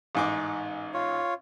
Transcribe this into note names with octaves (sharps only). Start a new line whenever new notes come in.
A1 G#2 D6
F4 C#5